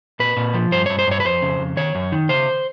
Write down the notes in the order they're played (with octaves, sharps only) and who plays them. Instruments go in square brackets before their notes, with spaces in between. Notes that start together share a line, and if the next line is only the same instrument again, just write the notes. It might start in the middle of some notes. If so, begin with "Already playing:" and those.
[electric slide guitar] A#2 B4
A#2
F3
G2 C5
G2 C#5
C5
G2 C#5
B4
F2 C5
C#3
F2
D#3 C#5
F#2
D#3
C#3 C5